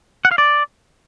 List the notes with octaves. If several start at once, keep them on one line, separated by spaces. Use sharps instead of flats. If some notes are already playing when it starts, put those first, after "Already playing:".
F#5
F5
D5